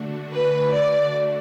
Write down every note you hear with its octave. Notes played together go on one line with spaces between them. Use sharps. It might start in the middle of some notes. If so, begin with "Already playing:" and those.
Already playing: D3 A3 D4 F#4
B4
D5